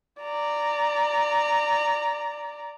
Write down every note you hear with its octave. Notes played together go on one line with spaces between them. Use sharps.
D5 A#5